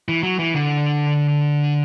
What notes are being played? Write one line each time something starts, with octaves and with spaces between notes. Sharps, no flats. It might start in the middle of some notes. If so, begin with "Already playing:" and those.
E3
F#3
E3
D3